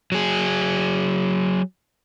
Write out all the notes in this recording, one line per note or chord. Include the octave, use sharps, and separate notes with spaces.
F#3 G#4